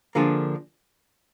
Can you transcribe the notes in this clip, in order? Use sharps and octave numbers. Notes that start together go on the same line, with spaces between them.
D3 F3 A#3 D4 G#4